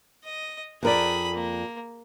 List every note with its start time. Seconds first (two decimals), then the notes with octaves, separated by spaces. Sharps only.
0.24 D#5
0.83 F2 G#4 A#4 D5 B5
1.34 A#3